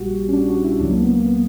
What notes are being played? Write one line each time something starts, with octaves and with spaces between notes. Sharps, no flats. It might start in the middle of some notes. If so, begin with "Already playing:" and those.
Already playing: A#1 A#2 G3 F#4 G4
C#4
D4
F#4
E4
C#2 C#3 F#3 D4
A#3
B3
A#3
B3